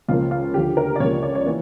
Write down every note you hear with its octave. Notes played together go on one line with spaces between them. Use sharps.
C#2 C#3 F3 A#3 F4
F4
D2 D3 F3 G4
A#4
D5
C#2 C#3 F3 A#3 C#5
D5
C#5
E3 A#3